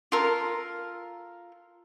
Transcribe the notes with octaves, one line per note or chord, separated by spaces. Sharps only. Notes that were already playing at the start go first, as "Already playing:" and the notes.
F4 A4 A#4